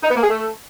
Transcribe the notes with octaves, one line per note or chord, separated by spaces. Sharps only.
D#4
B3
A#3
G#4
A3